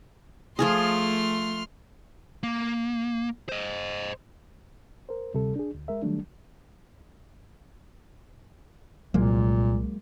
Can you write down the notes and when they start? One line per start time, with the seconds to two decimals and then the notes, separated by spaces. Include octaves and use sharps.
0.59 F3 A3 F4 G#4 C6 F6
2.43 A#3
3.49 C5 D#5
5.09 A#4 C5
5.34 D2 C3 G3 A4
5.56 D4 G#4
5.74 D2
5.88 G#3 A#4 E5
6.02 D#3 F#3 G3 A3 D4
9.14 C2 A#2 F#3 G#3 A#3